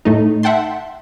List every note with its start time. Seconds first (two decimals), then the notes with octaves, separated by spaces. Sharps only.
0.05 A2 A3 D#4
0.43 E5 F#5 G5 A5 C6